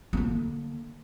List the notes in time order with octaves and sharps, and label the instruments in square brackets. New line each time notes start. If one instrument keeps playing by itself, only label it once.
[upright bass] D3 A#3